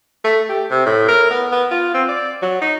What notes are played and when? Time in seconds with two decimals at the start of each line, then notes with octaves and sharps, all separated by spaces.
0.25 A3
0.49 G4
0.71 C3
0.86 A2
1.08 A#4
1.31 B3
1.52 B3
1.71 F4
1.94 C4
2.08 D5
2.42 F#3
2.62 D#4